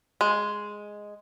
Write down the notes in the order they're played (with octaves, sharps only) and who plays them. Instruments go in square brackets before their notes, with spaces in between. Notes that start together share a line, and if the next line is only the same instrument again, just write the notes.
[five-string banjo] G#3